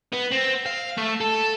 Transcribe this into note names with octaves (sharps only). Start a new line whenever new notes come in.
B3
C4
F5
A3
A4